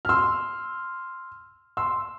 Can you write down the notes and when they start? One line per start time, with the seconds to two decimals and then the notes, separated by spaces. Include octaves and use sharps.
0.05 F6
0.09 C6 E6
1.77 C6 E6